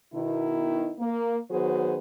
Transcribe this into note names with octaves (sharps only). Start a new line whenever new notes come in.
B2 D#3 E4
A#3
D#3 F#3 B3 F#4 G#4 C5